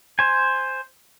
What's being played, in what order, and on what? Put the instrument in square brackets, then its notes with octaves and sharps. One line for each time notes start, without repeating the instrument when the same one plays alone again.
[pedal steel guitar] C5 G#5